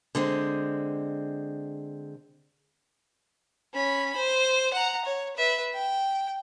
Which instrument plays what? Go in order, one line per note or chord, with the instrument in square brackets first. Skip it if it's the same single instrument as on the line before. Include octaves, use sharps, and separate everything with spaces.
[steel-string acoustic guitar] D3 G#3 C4
[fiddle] C#4 B5
C5
F#5 A#5
C#5
B4 E5
G5